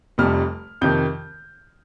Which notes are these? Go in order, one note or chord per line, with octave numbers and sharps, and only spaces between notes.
F1 F2 C3 G3 F6
F2 C3 D#3 G6